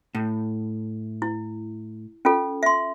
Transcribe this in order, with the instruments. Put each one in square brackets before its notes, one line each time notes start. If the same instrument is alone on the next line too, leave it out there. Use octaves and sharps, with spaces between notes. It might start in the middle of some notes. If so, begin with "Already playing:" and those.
[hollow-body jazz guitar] A2
[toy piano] E4
C#4 F4 A4
E5 C6